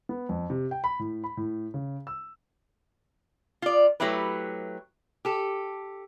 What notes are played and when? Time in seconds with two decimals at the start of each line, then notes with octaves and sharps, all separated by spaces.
0.09 B3
0.29 F2
0.50 C3
0.71 G5
0.84 B5
0.99 A2
1.24 B5
1.37 A2
1.74 C#3
2.07 E6
3.62 F4 D5
4.00 F#3 A3 E4 G4 B4
5.25 G4 A4